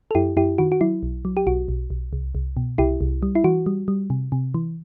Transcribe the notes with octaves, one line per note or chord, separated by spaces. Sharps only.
A4
F#2 E4 G4
F#2 E4 G4
D#3 F#4
F#4
F#3 E4
B1
F#3
G4
B1 F#4
B1
B1
C2
C2
B2
C2 E4 G4
C2
G3
E4
E3 F#4
G3
G3
C3
C3
E3